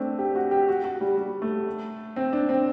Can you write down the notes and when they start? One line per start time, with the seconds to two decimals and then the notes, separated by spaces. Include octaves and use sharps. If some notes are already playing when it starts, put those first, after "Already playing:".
Already playing: A3 C4 D4
0.19 G4
0.35 F#4
0.51 G4
0.69 F#4
0.84 F#4
1.01 G3
1.17 G3
1.42 A3
2.16 C4
2.33 D4
2.49 C4